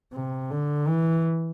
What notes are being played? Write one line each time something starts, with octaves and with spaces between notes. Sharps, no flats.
C3
D3
E3